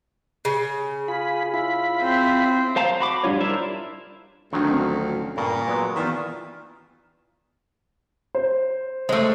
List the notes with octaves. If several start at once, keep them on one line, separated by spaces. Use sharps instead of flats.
C#3
F4 G#4 B5
E4 F4 B5
C4
C5 F5 A5 A#5
F#4 B5 D6
G3 D4 F4 C#5
D4 E4 A#4 C5 E5
D2 D#3 F3 F#3 D4
C4 C#4 D#5
G2 A#2 C#3
F#3 G#3 B3 B4
D#3 E3 B3 F4 D5 G5
C5
G#3 A3 C5